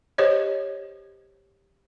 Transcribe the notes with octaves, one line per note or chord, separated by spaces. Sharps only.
G4 C5 C#5 D#5